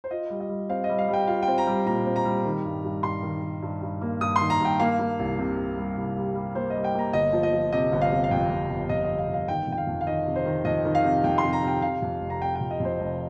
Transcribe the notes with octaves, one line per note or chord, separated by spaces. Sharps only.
C5
F4 D#5
G3
D#5
G3
C4 F5
D#5
G3
F5
G3
G5
F4 F5
G5
C4
A#5
G3
A#2 A#5
C4
A#5
G3
D#3
G2
G2
G2 C6
D#3
D#3
G2
G2
A#3
G2 D#6
C6
D#3
A#5
G2 G5
A#3 F5
A#3
C2
C3
C3
G3
C2
G3
G3
A#3 C5
G3 D#5
G5
A#3 A#5
G1 D#5
F3
D#5
F3
C3 D#5
G1
F5
C3
F5
F2 G5
F2
G1
F2 D#5
G1 D#5
F5
G1
F5
D#3 G5
F2 G5
F5
F2
F5
D#3 D#5
C3
C5
D#3
F2 D#5
D#3
F5
C3
F2 G5
C6
C3
A#5
C3 G5
C3 F5
F2
F1
A#5
C3 G5
G5
F2
D#5
F2 C5
F1